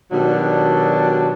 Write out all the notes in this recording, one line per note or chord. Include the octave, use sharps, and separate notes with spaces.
B2 D#3 F#3 G3 D4